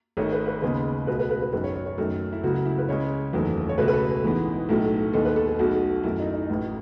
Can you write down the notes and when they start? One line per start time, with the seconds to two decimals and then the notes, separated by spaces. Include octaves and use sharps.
0.17 G#1 G#2 D#3 A3 C#5
0.32 B4
0.47 B4
0.62 D#2 C#3 G#3 B3 B4
1.07 C#2 B2 A3 B4
1.19 B4
1.31 B4
1.42 B4
1.52 G#1 F#2 D#3 B4
1.64 C#5
1.76 C#5
1.86 C#5
1.98 F#2 D#3 A3 A4
2.33 E4
2.43 C#2 C#3 F#3 A3 F#4
2.65 E4
2.78 B4
2.88 C#2 C#3 G#3 C#5
3.33 F#1 E2 D#3 F#3 A3
3.69 C#5
3.78 C#2 B2 A3 B4
3.88 B4
3.93 A4
4.08 G#4
4.24 A1 G#2 E3 B3
4.69 B1 A2 F#3 A3
5.13 D#2 D#3 G#3 B3 A4
5.25 B4
5.36 A4
5.47 G#4
5.59 B1 B2 A3 F#4
6.03 F#2 D#3 A3 E4
6.20 D#4
6.34 D#4
6.50 A1 A2 E3